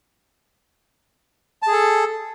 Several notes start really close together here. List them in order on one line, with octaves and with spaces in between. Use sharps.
A5 G#4 A4